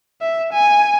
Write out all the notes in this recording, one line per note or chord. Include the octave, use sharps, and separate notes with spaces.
E5
G#5